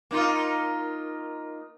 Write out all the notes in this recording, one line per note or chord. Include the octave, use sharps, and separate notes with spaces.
A#3 D#4 F4